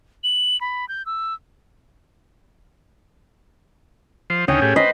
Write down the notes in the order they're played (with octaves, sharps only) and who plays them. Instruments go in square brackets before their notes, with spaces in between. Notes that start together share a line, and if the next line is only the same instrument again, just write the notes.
[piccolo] F#7
B5
G6
E6
[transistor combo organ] F3 C5
[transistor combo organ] D2 C#3 D#4 [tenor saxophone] C#4 [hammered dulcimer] G5
[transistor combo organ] A2 G4 G#4
[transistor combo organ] B4 C5 [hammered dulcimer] D#5